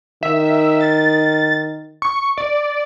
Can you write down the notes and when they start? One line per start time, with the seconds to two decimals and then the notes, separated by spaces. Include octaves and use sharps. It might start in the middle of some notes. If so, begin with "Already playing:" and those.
0.23 D#3 E5
0.81 A6
2.02 C#6
2.38 D5